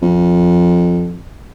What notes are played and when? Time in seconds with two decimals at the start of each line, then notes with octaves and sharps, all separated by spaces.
0.02 F2